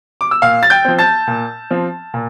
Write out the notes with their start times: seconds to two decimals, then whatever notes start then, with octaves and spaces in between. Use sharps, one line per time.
0.21 D6
0.31 E6
0.42 A#2 F5 F6
0.63 A6
0.70 G5 G6
0.85 F3 C4
0.99 A5 A6
1.27 A#2
1.71 F3 C4
2.14 A#2